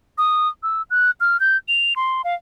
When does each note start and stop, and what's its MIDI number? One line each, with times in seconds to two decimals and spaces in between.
0.18 0.48 87
0.63 0.82 88
0.90 1.11 90
1.20 1.39 89
1.40 1.57 91
1.68 1.93 101
1.96 2.22 84
2.24 2.34 77